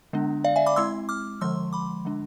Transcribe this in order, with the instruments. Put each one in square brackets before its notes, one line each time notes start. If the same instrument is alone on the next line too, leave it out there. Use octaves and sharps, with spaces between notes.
[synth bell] D3 G#3 B3 D4
D5 F5
E5 G#5
B5 D6
G#3 C4 E4 C6 E6
D6 F6
D3 F3 G#3 C6 E6
B5 D6
D3 G#3 D4